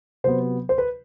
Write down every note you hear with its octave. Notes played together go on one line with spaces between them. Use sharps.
C3 F#3 B3 C5
C5
B4